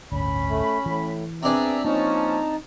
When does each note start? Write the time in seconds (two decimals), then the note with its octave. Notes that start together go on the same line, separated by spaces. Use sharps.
0.12 D1 G1 D2 C#4 B5
0.50 A3
0.86 A2 E3
1.43 B3 C4 D4 G#4 D5 E5 A#5
1.84 F3 A#3 C#4 D#4 A5 A#5